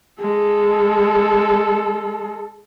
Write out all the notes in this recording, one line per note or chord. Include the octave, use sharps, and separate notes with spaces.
G#3 A4